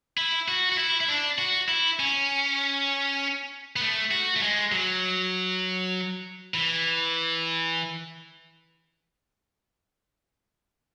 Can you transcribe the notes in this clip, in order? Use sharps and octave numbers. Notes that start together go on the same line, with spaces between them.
E4
F#4
F#4
E4
E4
D4
F#4
E4
C#4
B3
A3
F#4
A3
G#3
F#3
E3